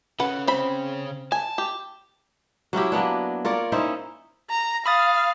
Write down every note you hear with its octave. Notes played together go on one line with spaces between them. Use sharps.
C#3 C#4 A4 B4 F#5
C4 B5
G#5 A5
G4
F#3 C#4 E4 G4
F#3 A#3 B3 D4
F4 A#4 C#5 D5
C#4 D#4 E4 C5
A#5
F5 B5 D#6 A6